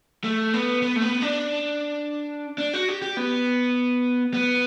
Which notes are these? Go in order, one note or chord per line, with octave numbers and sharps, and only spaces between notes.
A3
B3
B3
A3
B3
D4
D4
F#4
G4
G4
B3
B3